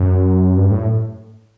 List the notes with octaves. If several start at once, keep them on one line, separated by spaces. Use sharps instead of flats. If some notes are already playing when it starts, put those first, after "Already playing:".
Already playing: F#2
G2
A2